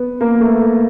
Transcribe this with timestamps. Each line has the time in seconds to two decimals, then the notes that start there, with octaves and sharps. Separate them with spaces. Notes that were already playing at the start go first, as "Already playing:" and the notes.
Already playing: B3
0.21 A#3
0.40 A3